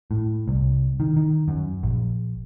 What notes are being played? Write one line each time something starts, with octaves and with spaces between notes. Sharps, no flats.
A2
C2
D#3
D#3
F#2
A#1